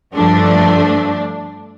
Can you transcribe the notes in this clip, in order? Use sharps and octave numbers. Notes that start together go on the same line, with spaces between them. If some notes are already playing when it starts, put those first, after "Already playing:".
G2 F3 A3 D4